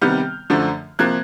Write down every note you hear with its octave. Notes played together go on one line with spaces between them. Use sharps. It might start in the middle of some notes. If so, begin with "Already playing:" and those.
C3 D#3 G3 B3 F6 G6
F#2 D3 F3 A3
C3 F3 A#3 F#6 G#6